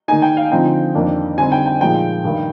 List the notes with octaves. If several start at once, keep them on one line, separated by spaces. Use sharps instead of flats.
D#3 A#3 D#4 G#5
G5
F5
D3 F3 C4 D#4 G5
F2 D#3 A#3 D4
D3 G3 C4 D#4 G#5
G5
G5
A#2 F3 G#3 D#4 G5
G2 D#3 G3